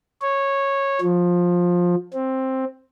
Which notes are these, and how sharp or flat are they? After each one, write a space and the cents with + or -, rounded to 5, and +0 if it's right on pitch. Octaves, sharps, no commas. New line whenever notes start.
C#5 -10
F3 +15
C4 +10